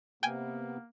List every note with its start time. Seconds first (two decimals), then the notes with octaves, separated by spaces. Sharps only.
0.23 C3 A#3 B3 G5 G#5